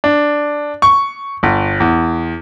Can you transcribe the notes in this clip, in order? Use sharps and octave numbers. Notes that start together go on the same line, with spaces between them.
D4
C#6
G1
E2